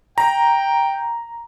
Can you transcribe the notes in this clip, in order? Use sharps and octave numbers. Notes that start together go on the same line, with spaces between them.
G5 A#5